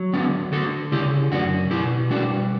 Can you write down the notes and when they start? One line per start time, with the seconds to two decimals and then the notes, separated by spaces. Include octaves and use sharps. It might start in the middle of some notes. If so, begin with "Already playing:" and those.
Already playing: F#3
0.13 D3 B3 D4
0.53 D3 F#4 A4
0.92 C#3 E4 G4
1.32 F#2 D4 F#4
1.70 B2 E4 G4
2.10 G3 D4 F#4